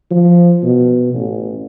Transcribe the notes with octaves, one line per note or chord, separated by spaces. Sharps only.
F3
B2
A1